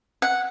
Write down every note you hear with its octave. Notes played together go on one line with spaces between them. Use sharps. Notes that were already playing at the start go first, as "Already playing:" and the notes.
F#5